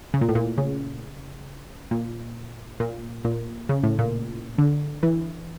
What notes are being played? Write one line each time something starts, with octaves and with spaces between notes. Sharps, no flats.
C#3
A#2
A2
A#2
C#3
A#2
A#2
A#2
C#3
A2
A#2
D3
E3